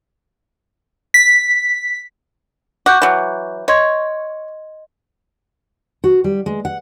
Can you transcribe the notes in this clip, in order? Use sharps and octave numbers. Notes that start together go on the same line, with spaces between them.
B6
F#4 D6 F#6 G6
E3 F#3
C#5 D#5 C6 G#6
F#4
G3
G#3
F#5